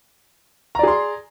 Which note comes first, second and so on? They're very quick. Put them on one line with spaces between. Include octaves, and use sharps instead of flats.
A#5 D5 G#4 C6